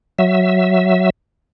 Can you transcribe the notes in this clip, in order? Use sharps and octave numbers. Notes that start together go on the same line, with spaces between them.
F#3 E5